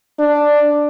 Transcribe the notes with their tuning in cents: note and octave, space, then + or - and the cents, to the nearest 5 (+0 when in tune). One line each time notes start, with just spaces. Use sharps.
D4 +5